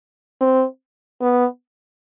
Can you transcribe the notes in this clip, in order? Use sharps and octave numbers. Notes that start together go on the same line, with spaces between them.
C4
B3